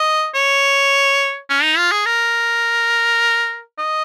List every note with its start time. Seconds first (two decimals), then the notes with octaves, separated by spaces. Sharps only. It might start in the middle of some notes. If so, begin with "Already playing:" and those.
Already playing: D#5
0.35 C#5
1.49 C#4
1.63 D#4
1.77 F4
1.92 G#4
2.06 A#4
3.79 D#5